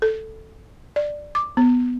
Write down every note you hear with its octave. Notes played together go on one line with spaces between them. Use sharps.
A4
D5
D6
B3